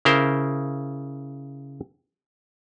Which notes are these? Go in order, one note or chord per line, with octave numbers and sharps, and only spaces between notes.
C#3 E4 A#4 C5